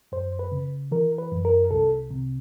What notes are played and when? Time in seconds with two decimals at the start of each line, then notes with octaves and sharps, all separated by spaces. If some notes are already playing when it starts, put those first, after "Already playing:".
0.12 F#2 C5
0.39 B4
0.52 C#3
0.92 E3 A#4
1.18 B4
1.32 F#2
1.45 A#4
1.71 C2 A4
2.10 C3